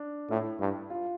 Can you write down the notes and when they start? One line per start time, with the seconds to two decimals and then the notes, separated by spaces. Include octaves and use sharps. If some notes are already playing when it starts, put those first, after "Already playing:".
Already playing: D4
0.30 A2 E4
0.60 G2
0.90 F4